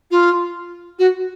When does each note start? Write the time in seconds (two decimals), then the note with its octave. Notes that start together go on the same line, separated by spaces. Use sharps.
0.11 F4
0.99 F#4